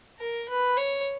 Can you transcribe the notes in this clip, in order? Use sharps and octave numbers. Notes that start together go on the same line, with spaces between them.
A#4
B4
C#5